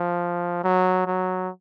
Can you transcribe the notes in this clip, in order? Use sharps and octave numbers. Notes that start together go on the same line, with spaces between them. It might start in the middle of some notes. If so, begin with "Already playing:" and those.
Already playing: F3
F#3
F#3